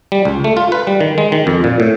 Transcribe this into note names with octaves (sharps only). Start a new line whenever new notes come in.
G3
C#2
A3
F4
B4
G3
D#3
G#3
D#3
F2
A#2
A2